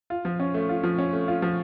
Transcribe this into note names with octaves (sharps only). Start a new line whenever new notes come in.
F4
F3
C#4
A3
F4
F3
C#4
A3
F4
F3